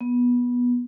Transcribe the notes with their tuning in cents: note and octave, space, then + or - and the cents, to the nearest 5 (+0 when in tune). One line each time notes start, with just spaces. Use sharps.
B3 -15